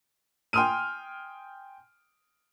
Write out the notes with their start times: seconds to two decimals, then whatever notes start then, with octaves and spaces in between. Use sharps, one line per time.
0.53 G5 G#5 C6 D#6 F6 D#7